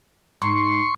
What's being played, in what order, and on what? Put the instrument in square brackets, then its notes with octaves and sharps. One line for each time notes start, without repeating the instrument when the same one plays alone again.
[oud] G#2 [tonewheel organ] C6 C#6